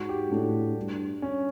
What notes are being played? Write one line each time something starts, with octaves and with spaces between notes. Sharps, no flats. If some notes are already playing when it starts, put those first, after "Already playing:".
Already playing: G#2 F#4
G4
A2 D4
G2
C#4